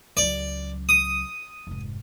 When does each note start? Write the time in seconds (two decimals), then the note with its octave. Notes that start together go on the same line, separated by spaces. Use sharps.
0.17 C#2 F#3 D5
0.89 D#6
1.67 F1 G#2